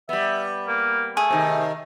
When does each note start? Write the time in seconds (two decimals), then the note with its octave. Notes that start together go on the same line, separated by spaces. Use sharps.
0.09 G3 B3 E5
0.68 A#3
1.17 A3 G#4
1.30 C3 D#3